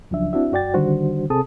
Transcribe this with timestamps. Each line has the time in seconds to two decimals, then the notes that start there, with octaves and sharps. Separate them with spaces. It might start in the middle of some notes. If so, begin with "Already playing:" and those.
0.11 C#2 C#3 F3 F#3 D4 E5
0.33 C4 D4 E4 F#4 E5
0.52 F#2 F#4 D5 G5 A6
0.74 D3 D#3 G3 D4 F#4 C5
1.30 C3 C4 G#4 A4 A5 D#6